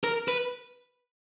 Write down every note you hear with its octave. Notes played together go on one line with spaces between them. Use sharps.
A#4
B4